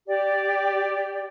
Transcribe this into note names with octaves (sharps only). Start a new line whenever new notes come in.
G4 D5